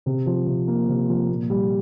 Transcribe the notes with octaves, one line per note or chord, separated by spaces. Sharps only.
C3
F3
C3
A#3
C3
F3
A#2
G3